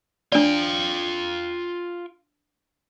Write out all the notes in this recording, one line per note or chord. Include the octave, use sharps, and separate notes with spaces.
D4 F4 D5 G5